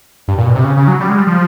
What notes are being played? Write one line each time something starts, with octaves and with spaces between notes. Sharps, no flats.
G2
A#2
B2
C3
C#3
C#3
F#3
G3
G#3
G3
F3